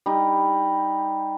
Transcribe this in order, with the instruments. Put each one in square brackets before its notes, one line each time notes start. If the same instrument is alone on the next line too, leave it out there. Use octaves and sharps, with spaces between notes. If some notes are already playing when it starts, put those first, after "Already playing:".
[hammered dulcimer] G3 D#4